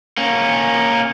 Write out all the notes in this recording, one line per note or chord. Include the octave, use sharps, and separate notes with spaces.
A#3 C#4